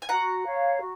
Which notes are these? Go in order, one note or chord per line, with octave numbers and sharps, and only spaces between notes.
G#5
F#4 F#5 A#5
C#5 F5
F#4